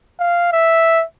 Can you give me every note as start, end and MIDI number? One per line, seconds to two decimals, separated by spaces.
0.19 0.49 77
0.52 1.04 76